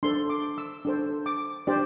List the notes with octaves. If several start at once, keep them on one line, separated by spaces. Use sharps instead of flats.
D4 A4 C5 C6
D6
E6
D4 A4 C5
D6
D4 G4 C5 D5